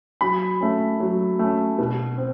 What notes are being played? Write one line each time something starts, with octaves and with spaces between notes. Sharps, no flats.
F#3 B5
A3 C#4
F#3
A3 C#4
B2
C4